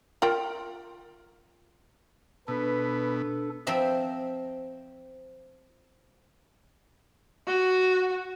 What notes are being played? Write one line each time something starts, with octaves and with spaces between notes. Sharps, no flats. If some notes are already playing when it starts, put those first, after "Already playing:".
F4 A#4 G5
B2 D4 A4 B4
F3 C4 E5 A#5 B5
F#4